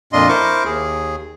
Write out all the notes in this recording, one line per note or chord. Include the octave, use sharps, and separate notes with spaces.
F2 A#2 D4 F4 D#5 C6
E4 A#4 C5 C#6 D6
D#2 G#4